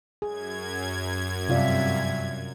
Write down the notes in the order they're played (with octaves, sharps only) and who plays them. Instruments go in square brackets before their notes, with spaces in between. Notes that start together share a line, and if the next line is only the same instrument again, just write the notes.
[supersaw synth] F#2 G#6 [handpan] G#4
[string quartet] G2 E5 [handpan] C3 F4 D5